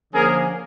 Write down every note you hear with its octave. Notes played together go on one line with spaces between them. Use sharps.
D3 F3 A#3 C#4 G#4 A#4